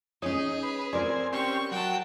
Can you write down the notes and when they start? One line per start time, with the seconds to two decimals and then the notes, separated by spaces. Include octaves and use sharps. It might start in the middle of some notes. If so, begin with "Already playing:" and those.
0.22 C#4 D#4 G#4 C#5
0.63 B4
0.93 C4 A#4 D5 G#5
1.33 C4 C#4 G4 C#6
1.71 F#3 G5 A5